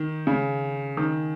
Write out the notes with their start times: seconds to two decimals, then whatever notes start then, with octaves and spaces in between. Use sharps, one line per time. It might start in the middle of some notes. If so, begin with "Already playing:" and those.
Already playing: D#3
0.27 C#3
0.97 D#3